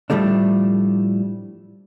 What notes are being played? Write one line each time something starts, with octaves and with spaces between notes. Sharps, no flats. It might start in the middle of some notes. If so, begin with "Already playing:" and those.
A2 F3 G3 A3 D4